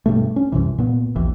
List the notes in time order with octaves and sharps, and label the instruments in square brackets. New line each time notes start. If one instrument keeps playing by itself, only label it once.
[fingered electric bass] G2 B2 A3
C#4
C2 F#2 C3 E3
A#2 B3
A#1 D#2 E3